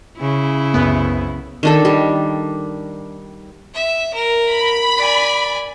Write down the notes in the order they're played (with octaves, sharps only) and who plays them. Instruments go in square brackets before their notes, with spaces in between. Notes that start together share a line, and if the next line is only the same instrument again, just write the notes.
[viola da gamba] C#3 E4
[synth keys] C2 F#2 B3
[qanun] D#3 D4 A4
G3
[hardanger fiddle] E5
A#4
[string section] B5
[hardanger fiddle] D5 G#5